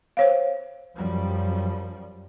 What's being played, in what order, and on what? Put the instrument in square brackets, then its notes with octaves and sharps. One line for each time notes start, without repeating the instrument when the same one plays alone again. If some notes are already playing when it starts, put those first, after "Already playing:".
[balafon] C5 C#5 F5
[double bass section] F#2 F3 G3